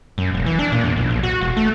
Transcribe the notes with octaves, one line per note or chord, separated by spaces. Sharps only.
F#2
E1
E3
D4
A#2
E2
B1
A#1
F#4
E1
A3